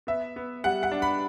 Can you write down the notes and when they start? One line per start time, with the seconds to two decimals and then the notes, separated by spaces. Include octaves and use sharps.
0.07 B3 E5
0.36 B3
0.64 G3 F#5
0.83 F#5
0.92 D4
1.02 B5